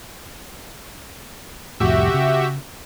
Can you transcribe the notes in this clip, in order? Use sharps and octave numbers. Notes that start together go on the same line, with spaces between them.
C2 F2 A2 F#4 G4 E5
C#3